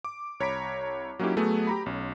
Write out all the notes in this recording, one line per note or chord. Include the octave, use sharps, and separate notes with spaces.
D6
C2 C#5 A#5 B5 B6 D7
F#3 A#3 C#4 D#4 E4 G4
F#3 A3 B3 G#4
G4 A#5 B5
B1 C#4